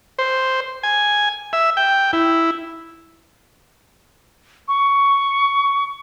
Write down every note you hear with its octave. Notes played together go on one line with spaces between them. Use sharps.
C5
G#5
E5
G5
E4
C#6